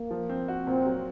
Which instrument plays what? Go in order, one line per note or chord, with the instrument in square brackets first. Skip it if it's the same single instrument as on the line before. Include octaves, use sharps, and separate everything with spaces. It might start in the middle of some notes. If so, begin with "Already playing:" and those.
Already playing: [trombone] A#3
[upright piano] F3
C4
F#4
[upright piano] A#2 [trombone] C4
[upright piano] F#3